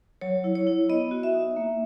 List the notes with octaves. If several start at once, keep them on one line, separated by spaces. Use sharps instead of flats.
F#3 C#5
E4
C#5
E4
B3 D#5
F#4
E5
D#4
A#3